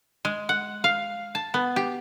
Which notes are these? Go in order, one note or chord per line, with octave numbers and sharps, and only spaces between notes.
G#3
F#5
F5
A5
B3
G4